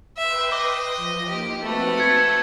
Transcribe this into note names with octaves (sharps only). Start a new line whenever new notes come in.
B4 E5 G5 C6
D#5 D6
F3
A#3 D#4 G4
A3 C4 F#4 B4
A5 E6 G6 G#6 C#7